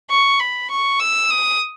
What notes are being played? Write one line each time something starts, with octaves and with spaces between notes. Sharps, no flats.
C#6
B5
C#6
E6
D#6